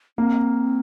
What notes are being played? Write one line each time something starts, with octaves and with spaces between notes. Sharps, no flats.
A#3 C4